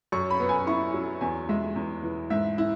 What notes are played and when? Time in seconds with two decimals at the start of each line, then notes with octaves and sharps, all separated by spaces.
0.12 F#2 C#6
0.30 B5
0.40 B3
0.49 G#5
0.67 E4 C#6
0.94 F#3
1.21 E2 G#5
1.49 G#3 E5
1.76 E2
2.03 E3
2.30 G#2 E5
2.58 E4